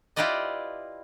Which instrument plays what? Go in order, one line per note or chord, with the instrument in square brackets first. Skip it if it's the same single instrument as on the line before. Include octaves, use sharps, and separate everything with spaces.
[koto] E4 F4 G4 B4 D5 D#5